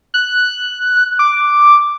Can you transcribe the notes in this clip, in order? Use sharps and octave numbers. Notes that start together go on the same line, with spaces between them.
F#6
D6